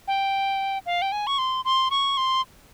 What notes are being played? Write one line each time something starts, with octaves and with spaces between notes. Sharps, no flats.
G5
F5
G5
G#5
C#6
C6
C6
C#6
C6